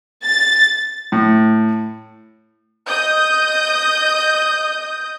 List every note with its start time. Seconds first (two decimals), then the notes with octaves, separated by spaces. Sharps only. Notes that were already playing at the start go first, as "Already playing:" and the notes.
0.24 A6
1.12 A2
2.88 D#5 D#6 G6